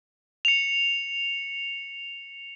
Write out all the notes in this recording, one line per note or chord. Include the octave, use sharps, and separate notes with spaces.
C#7 F7